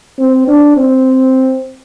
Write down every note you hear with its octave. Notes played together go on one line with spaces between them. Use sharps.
C4
D4
C4